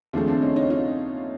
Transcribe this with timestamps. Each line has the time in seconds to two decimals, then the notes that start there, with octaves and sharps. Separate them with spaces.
0.13 D#2 C#3 F3 A3 C4 D4
0.28 C4 D4
0.42 C#4 D#4
0.56 C#4 D#4
0.70 D#4 F4